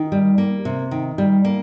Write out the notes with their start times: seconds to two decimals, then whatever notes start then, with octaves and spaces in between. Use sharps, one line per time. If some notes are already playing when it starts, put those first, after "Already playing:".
Already playing: D#3
0.12 G3
0.38 A#3
0.65 C3
0.91 D#3
1.18 G3
1.45 A#3